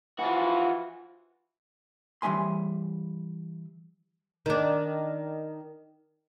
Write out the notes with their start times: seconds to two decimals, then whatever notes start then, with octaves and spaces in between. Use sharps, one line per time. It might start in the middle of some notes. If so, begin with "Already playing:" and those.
0.19 E3 F3 F4 F#4
2.22 E3 G3 D#4 E5 G#5 C6
4.46 D#3 D4